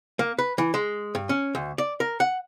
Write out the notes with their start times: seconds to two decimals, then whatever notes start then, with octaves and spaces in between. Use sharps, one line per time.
0.19 A#3
0.39 B4
0.58 E3
0.74 G#3
1.15 G2
1.29 C#4
1.55 D2
1.78 D5
2.00 A#4
2.20 F#5